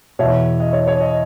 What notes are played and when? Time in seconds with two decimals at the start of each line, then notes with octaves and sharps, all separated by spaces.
0.19 E2 B2 C#5 E5
0.60 D#5
0.73 C#5
0.88 C#5
1.01 D#5